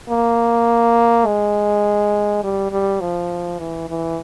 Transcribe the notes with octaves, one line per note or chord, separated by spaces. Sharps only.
A#3
G#3
G3
G3
F3
E3
E3